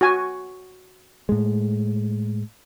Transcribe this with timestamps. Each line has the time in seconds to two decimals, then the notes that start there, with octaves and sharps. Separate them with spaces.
0.01 F#4 G#5
1.29 A2 G#3